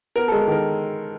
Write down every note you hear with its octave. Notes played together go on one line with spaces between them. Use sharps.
B3 A#4
G#3 A4
D#3 A#4